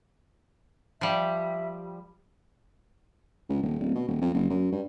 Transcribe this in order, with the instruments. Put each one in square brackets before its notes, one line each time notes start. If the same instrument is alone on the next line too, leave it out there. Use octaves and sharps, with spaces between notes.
[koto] F3 G3 [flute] E5
[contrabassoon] C#2
D#1
D1
B2
D#1
F2
F#1
F#2
G2